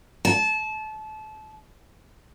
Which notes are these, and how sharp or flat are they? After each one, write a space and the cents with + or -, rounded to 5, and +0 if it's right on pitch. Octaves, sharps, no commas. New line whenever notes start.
A5 -25